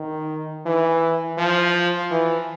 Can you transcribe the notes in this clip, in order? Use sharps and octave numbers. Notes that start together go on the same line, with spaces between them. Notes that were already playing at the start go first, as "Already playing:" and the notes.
Already playing: D#3
E3
F3
E3